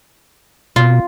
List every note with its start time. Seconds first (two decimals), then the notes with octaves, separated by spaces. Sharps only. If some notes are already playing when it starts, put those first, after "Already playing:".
0.76 B2 F4